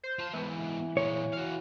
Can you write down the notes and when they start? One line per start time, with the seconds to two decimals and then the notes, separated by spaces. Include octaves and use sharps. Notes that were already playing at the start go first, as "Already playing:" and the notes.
0.03 C5
0.19 F4 A5
0.33 G#2 E3 B3
0.97 A#2 G#3 C#5
1.33 F#4 F5